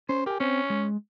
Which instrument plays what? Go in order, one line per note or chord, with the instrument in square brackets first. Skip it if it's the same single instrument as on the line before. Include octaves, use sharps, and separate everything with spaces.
[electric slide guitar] C#4 [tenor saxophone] C5
[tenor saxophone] G4 [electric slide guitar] A#4 G#5
[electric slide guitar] C4 C5 [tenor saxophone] C#4
[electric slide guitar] G#3